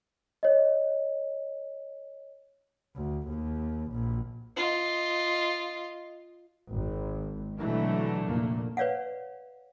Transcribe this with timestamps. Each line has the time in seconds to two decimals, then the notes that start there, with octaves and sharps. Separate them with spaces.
0.43 C#5 D#5
2.96 D2
3.28 D#2
3.92 A#1
4.56 F4 D#5
6.72 G#1
7.58 B2 D3 E3 F#3 A3
8.25 F1 A#2 A#3
8.77 B4 C#5 D5 F5 F#5